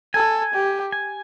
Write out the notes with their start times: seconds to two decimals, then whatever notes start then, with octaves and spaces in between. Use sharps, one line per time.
0.14 A4 G#5
0.54 G4
0.92 G#5